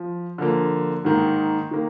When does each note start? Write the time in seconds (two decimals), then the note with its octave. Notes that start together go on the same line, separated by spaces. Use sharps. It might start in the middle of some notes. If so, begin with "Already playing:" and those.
Already playing: F3
0.38 D3 F3 A#3
1.05 G#2 D#3 A#3
1.71 D#3 A#3